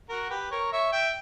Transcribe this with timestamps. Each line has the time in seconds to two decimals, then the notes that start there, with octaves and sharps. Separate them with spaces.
0.09 F#4 A#4
0.30 G4 B4
0.51 A#4 C#5
0.72 C#5 E5
0.92 E5 G5